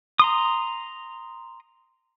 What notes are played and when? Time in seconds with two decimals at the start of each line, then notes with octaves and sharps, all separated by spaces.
0.19 A#5 C6 D#6